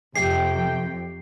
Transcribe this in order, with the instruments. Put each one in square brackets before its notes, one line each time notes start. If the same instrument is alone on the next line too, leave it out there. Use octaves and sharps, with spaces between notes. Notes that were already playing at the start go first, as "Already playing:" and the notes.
[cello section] F2 [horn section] C3 G5 [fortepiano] G4 [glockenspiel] C7